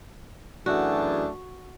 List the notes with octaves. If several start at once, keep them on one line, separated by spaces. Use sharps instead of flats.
F#2 E3 A3 D4 F#4 G#4